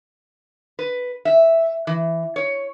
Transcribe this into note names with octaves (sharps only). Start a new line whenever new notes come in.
B4
E5
E3
C#5